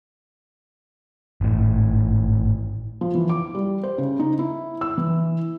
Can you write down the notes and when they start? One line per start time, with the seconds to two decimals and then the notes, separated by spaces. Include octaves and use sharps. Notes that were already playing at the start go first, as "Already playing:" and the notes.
1.41 G#1 A2
3.01 F3
3.15 E3
3.29 D6
3.55 G3
3.83 C5
3.98 C#3
4.19 D#4
4.39 E4
4.81 E6
4.98 E3